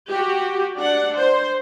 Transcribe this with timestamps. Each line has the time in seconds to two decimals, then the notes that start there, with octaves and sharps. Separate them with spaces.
0.11 F#4 G4
0.78 D4 F#5
1.17 C5